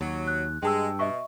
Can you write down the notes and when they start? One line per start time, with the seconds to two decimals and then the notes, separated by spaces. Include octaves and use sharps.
0.01 D#2 F#3
0.27 F#6
0.63 G2 G#3 G5 A5 E6
0.99 B2 D#5 E5 C#6